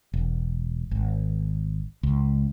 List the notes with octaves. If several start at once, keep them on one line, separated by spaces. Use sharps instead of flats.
E1
G#1
C#2